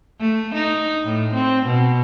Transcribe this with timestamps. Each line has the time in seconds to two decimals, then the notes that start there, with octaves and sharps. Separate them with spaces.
0.21 A3
0.55 D#4
1.05 A2
1.34 C4
1.66 B2